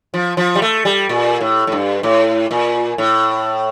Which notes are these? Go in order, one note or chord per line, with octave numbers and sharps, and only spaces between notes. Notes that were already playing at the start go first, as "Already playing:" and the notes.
F3
F3
G3
A3
G3
A#2
A2
A2
G2
A2
A#2
A2